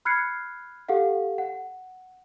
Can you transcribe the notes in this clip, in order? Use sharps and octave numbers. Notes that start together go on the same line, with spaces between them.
B5 F6 F#6 G#6 C7 C#7
G4 A4 F5 F#5
F#5